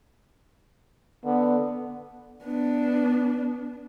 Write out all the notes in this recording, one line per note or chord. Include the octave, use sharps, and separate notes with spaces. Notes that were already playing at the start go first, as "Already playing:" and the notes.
D3 B3
B3 D4